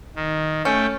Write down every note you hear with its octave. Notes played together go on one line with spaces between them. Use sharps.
D#3
A3 C#4 G5